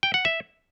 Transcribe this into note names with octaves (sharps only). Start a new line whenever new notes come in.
G5
F#5
E5